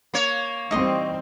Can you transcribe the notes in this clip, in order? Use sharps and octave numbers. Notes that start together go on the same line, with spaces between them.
A#3 C#5
E3 G3 C4 D#4 D#5 C6